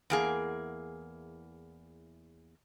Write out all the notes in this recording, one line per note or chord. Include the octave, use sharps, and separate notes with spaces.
E2 A#3 G#4